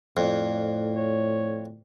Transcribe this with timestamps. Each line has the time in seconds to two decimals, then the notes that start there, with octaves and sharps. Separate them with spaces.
0.17 F2 A2 D5 C7
0.96 C#5